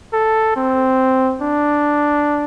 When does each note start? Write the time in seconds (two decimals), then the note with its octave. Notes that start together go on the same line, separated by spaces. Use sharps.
0.13 A4
0.56 C4
1.42 D4